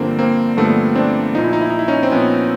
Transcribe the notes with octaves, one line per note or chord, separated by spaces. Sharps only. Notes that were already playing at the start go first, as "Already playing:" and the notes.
Already playing: G2 D3 F3 A#3 C4
A#3 C4
G2 D3 F3 A3 B3
C4 D4
A#2 F3 D#4
E4
D#4
E4
D#4
E4
C#4 D#4
C4
A#2 F3 B3 C#4